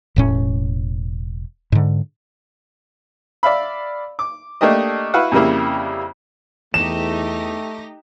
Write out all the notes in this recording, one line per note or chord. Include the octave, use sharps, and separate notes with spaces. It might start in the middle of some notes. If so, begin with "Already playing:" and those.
E1 A2 C#4
G#2 D3
D5 E5 F5 B5
D6
A3 A#3 D4 G4 D#5
E4 F#4 B4 F5 F#5
F2 C#3 G3 A#3 E4
E2 A3 D#4 G4 A#6 E7